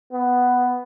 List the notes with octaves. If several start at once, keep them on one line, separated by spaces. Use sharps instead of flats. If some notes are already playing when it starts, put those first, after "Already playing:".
B3